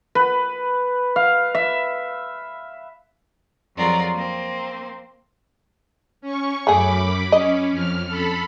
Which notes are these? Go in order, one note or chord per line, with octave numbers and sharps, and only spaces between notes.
B4
F5
E5
F2 F#3 F4 G#4 A#4 D5
A#3 C4
C#4 C#6
F#2 A3 G#4 B5 D6
C#4 D#5
F2 F6
A4 B5